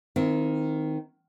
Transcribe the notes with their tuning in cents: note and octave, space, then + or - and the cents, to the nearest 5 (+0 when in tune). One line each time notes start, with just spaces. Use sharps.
D#3 +0 C4 -15 E4 +45